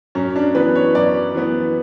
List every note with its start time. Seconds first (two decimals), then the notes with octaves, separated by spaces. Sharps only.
0.15 F#2 C#4
0.36 D4
0.55 E3 B3 B4
0.75 C#5
0.95 F#2 D5
1.34 E3 B3